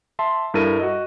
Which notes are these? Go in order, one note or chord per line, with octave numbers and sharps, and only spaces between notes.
E5 A5 C6
G2 E4 A4 A#4 D#7
F#4 D#5